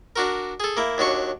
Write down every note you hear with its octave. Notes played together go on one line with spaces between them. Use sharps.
D4 F#4 A#4
G#4 A4
A#3 E4
D#2 F#3 D4 C#6